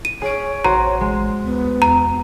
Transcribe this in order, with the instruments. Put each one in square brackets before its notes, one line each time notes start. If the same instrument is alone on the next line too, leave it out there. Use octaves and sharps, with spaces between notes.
[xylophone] D#7
[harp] G#4 D7 [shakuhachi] C#5
[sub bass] A1 [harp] F#4 C5 [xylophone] A#5
[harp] G#3
[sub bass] D2 [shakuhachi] B3
[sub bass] E2 [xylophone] A#5